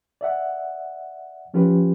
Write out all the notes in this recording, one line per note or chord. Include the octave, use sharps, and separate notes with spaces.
D5 E5 F#5
F3 C#4 F4 G4 B4